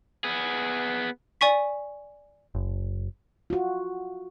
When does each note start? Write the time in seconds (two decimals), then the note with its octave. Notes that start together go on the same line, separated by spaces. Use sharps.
0.24 B3 G#4
1.41 D5 G#5 C#6 B6
2.55 F#1
3.50 F4 F#4